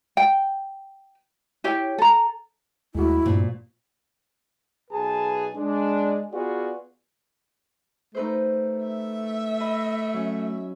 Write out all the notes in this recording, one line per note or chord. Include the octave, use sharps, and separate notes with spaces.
G5
E4 G4 C#5 G5
A4 A#5
D#2 G#3 A3 E4 F#4
G2 A#2 F3
B1 G#4 B4 A5
G#3 D4
B3 F4 F#4 G#4 D5
A3 D#4 B4 C5
E5
D#5 B5
F#3 C#4